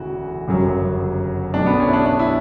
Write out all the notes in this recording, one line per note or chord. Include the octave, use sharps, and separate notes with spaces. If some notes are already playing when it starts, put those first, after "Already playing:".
Already playing: E1 D2 C#3 E3 F#4
G1 F#2 C#3 F#3
B1 B2 A3 D4
B3
C#4
E4
D4
D4
E4